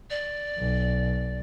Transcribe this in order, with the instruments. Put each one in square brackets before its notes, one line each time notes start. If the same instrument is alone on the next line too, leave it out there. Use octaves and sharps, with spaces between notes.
[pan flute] D5
[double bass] B1